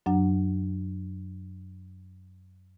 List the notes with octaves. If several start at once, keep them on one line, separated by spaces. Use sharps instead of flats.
F#2 F#3 D4 F#5